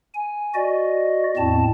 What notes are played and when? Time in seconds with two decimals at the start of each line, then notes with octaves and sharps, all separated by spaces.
0.14 G#5
0.54 F#4 D5 D#5
1.37 E2 A2 C4 A5